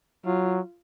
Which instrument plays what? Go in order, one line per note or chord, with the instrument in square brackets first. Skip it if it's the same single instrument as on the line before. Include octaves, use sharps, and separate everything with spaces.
[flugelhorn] F#3 [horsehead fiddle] F4